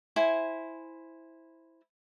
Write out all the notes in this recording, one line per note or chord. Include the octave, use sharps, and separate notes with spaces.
E4 C5 G#5